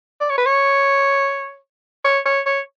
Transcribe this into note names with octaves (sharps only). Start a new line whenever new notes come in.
D5
C#5
B4
C#5
C#5
C#5
C#5